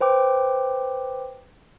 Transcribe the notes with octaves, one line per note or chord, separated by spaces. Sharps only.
B4 C5 G5 D6